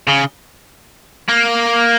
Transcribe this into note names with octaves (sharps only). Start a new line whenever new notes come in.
C#3
A#3